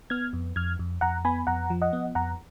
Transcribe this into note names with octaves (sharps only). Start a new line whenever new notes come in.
B3 F6 G#6
F2
F2 F6 G#6
F2
F2 F#5 A#5
B3 G#5 B5
F2 F#5 A#5
F3
D#5 F#5
B3
F2 F#5 A#5